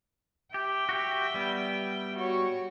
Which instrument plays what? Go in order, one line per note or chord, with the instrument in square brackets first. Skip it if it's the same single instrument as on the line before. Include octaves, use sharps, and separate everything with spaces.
[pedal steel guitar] G4 [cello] E5 G5
[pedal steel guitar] F#4 G4
G3 B3
[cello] F#4 C#5